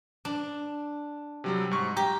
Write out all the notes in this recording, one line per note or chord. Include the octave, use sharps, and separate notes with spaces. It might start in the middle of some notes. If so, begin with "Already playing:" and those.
D4
C3 F#3 G3
G#2 C#6
G4 A#5